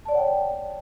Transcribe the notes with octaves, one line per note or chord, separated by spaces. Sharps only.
C#5 D5 F#5 G5 A5